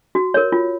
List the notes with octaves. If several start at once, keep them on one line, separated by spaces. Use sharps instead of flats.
F#4
A#4 C#5
F4